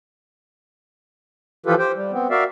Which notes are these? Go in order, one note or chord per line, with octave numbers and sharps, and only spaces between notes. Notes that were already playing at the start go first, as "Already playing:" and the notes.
E3 F3 F4 G4 A4 B4
G4 C5 G5
G3
B3 C4
F#4 A#4 D5 E5 F5